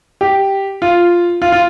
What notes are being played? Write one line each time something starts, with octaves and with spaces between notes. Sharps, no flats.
G4
F4
F4
F4